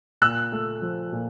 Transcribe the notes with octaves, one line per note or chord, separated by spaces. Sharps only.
A#2 E6 F#6
A3
F3
A#2